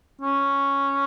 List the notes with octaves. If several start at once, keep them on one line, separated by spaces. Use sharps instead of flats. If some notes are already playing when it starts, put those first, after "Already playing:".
C#4